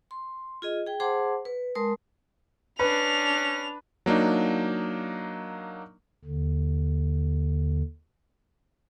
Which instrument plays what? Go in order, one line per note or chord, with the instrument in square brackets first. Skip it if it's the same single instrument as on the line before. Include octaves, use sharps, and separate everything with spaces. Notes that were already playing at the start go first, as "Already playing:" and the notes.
[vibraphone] C6
F4 G#4 D#5
G#4 G5
G#4 C5 F#5 A5 C6 D6
B4
G#3 A#4 A5 C6 D#6
[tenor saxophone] C#4 [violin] D4 F7 [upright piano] B4
[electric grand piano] F#3 A#3 D4 D#4
[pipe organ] D#2 D3